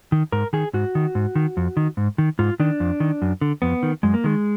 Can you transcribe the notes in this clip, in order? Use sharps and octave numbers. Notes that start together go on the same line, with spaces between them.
D#3
G#2 A#4
D#3 G#4
G#2 F#4
D#3
G#2
D#3
F2
D#3
G#2
D#3
G#2 F4
D#3 D4
F2
D#3
F#2
D3
F2 B3
D#3
F#2 G#3
A#3
D#3 G#3